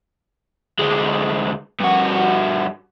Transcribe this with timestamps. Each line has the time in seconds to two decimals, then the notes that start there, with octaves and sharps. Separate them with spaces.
0.79 D2 G#3
1.80 G2 F#4